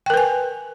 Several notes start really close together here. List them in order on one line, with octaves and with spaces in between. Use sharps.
G5 A#4 B4 G#5